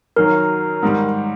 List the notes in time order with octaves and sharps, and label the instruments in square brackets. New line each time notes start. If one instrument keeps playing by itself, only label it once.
[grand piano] F#2 D#3 F#3 [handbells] A#4
[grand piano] G#2 D#3 G3